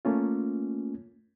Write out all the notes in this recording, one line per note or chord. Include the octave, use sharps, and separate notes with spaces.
A3 A#3 C#4 F4